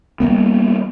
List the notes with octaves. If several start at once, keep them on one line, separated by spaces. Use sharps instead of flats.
G3 G#3 A#3 B3